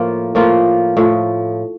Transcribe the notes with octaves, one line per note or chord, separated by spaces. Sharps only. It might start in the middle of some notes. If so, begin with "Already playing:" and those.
Already playing: A2 F3 A#3 F4
A2 F3 A#3 F4
A2 F3